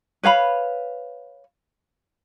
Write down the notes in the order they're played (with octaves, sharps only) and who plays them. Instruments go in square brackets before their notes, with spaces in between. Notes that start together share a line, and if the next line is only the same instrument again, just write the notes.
[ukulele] B4 C#5 F5 B5